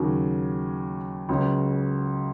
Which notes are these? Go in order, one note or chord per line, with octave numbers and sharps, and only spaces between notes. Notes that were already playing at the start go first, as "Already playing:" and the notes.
Already playing: D#2 C#3 F#3
C#2 C#3 F#3